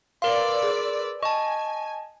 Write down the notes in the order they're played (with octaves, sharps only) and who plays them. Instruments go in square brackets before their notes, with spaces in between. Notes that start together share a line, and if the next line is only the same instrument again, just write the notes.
[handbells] A#4 C6 [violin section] B4 D5 E6 [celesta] F5 G7
[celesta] G#4
[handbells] D#5 A5 [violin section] G#5 [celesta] C#6